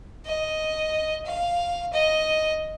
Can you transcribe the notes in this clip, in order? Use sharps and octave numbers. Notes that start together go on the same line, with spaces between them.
D#5
F5
D#5